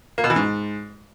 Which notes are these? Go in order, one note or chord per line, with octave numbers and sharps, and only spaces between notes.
A#3
B2
E3
G#2